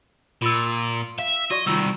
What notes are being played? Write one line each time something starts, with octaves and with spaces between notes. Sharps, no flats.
A#2 F4 E6
E5 F5
F#4 D5 D#5 C#6
C2 D#3 F4 E6